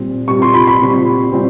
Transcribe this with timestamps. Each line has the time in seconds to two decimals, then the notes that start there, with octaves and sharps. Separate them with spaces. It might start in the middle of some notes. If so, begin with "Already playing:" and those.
Already playing: A#2 G3 C4
0.28 A#2 G3 C4 C#6
0.42 C6
0.54 B5
0.68 B5
0.81 A#2 G3 C4
1.32 A#2 G3 C4